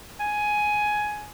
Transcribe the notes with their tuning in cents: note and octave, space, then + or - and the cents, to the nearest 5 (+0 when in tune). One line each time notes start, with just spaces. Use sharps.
G#5 +10